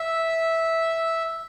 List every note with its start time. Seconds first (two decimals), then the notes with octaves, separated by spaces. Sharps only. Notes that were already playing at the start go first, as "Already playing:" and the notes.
Already playing: E5